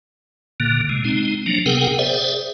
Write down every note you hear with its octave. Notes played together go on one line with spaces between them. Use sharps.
A#2 D3 A#3
C3 G#3
G#3 C4 D#4
F3 F#3 A#3 D4
C3 B3 G#4 A#4 F#5 G5
G#4 C5 D5 E5